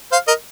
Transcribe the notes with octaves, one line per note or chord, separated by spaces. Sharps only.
C5 F5
A#4 D#5